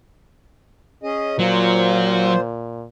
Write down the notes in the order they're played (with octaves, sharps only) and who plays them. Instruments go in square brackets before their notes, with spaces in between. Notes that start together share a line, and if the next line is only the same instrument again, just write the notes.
[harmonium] C#4 G#4 D#5
[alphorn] A#2 [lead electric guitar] F#3 [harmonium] F4 C5